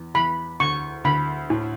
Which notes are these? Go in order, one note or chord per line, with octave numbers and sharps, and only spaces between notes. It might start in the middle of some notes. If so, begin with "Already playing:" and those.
Already playing: E2
E2 B5
D2 C#6
D2 B5
A2